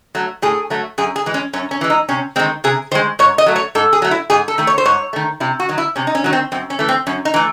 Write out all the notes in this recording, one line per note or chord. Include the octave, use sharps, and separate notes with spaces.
F#3 A3
A2 G#4
F#3 A3
F#2 G#4
G#4
E3 G#3
C#4
F#2 C#4
C#4
E3 G#3
D#4
C3 C#4
D#3 G#3 C4
C3 G#4
D#3 G#3 C5
G#2 C#5
D#5
F#3 A3
C#5
G#2 A4
G#4
F#3 A3
E4
G#2 G#4
A4
D#3 A3
C#5
C5
G#2 C#5
D#3 A3
C3 E4
F#4
D#3 F#3
E4
C3 C#4
D#4
C#4
D#3 F#3
C4
F#2 C4
C#4
E3 A3
C4
F#2 C#4
D#4
E3 A3